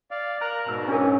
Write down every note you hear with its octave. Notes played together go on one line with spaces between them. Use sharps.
D5 F5
A#4 A#5 F#6
G#2 B2 A#5 E6
C#4 D4 G#4 A#4